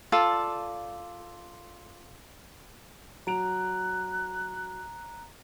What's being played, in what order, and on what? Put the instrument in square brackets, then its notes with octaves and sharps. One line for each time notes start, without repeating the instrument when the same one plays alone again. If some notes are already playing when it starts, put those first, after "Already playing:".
[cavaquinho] F4 A4 D5
[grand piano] F#3 D7 F7 [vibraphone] A#5 [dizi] F#6